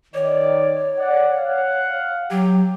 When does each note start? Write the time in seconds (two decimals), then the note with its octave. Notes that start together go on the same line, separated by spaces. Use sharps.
0.14 D#3 C#5 D5
0.97 D5 F#5
1.33 F5 F#5
2.31 F#3 G4